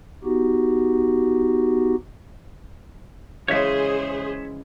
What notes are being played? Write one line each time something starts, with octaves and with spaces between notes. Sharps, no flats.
B3 D#4 F#4 G4
C#3 E3 G#3 G#4 C5 C#5 E5